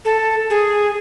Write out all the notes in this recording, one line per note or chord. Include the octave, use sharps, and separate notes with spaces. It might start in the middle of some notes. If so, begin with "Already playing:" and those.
A4
G#4